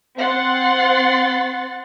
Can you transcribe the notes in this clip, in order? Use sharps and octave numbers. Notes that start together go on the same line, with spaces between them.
C4 F#5 C6 A6